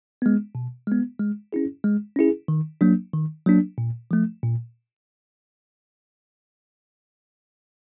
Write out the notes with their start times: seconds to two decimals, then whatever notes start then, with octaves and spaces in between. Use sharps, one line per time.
0.22 G#3 B3
0.55 B2
0.87 G#3 B3
1.19 G#3
1.53 C#4 E4 G#4
1.84 G#3
2.16 C#4 E4 G#4
2.48 D#3
2.81 F#3 A#3 D4
3.13 D#3
3.46 F#3 A#3 D4
3.78 A#2
4.11 F3 A3
4.43 A#2